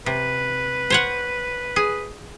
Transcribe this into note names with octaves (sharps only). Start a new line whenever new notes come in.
C3 B4
C5 C#5 F#5
G#4